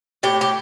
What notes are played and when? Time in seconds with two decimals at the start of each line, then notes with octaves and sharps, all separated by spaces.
0.23 A2 G4
0.41 G4